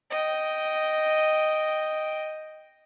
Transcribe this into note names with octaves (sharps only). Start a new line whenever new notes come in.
D#5 G5